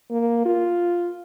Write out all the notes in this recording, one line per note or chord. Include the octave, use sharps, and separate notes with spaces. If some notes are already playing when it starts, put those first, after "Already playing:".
A#3
F4